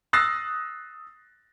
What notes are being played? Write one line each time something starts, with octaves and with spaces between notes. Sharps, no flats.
D#6 E6 F#6 A6 A#6 C7